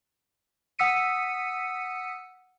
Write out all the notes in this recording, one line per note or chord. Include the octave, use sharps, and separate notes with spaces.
F#5 D#6 E6 B6 C#7 D#7